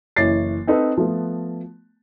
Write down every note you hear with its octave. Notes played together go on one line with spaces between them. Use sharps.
F#1 E3 C#5 D6 A6 C7
C4 D#4 A4 B4
F3 A3 B3